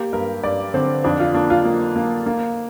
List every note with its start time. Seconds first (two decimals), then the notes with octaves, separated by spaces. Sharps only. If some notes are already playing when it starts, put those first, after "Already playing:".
Already playing: A#3 G4
0.13 G2 A#4
0.44 G2 D5
0.74 D3 C4
1.04 F2 D4
1.20 F4
1.34 A#3 D4
1.50 F4
1.65 A#3
1.96 A#3
2.26 A#3